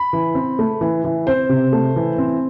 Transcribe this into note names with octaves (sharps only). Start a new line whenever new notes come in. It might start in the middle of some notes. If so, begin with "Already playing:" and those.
Already playing: B5
E3
C4
A3
E3
E3
C4 C5
C3
A3
E3
C4